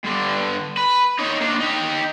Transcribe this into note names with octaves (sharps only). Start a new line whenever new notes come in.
G2 D3
B4
D#4 C#5
A#3 D4
D#4 G4